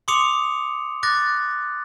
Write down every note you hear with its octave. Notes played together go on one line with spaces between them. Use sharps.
C6 D6 D#6 C#7 F7
D6 F#6 A6 A#6